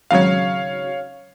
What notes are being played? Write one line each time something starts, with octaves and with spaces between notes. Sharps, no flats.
G#1 C#3 F#3 C#5 F5